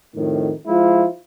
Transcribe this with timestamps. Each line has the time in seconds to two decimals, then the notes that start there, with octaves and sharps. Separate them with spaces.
0.15 F2 A2 D#3
0.67 F3 G#3 E4 F4